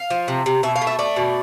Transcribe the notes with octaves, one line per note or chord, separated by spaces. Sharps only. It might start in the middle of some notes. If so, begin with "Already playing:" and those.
Already playing: F5
F3
C3
C3
B2 E5
F5
A3
E5
A3 D5
B2